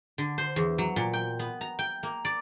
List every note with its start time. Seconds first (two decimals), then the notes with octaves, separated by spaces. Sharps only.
0.18 D3
0.38 C5
0.56 E2
0.78 F#3
0.96 A#2
1.13 G5
1.39 B3
1.61 A#5
1.79 G5
2.03 A#3
2.25 D5